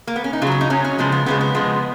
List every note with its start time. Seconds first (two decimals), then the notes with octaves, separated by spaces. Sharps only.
0.07 A#3
0.16 B3
0.24 C#4
0.33 D#4
0.42 C#3 F4
0.47 F#3 C#4
0.61 D#4
0.70 C#3 F#3 C#4
0.84 C#4
0.98 C#3 F3 G#3 B3
1.12 B3
1.26 C#3 F3 G#3 B3
1.41 B3
1.55 C#3 F3 G#3